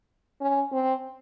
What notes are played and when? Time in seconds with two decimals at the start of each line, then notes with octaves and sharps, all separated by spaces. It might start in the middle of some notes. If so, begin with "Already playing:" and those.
0.41 C#4
0.73 C4